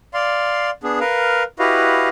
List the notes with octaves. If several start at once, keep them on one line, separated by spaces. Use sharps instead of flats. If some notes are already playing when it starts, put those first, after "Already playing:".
D5 F5 C6
B3 D4 G#4
A#4 B4 F5
E4 F#4 G4 B4 D#5 F5